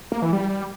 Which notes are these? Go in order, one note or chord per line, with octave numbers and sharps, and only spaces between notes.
A#3
E3
G3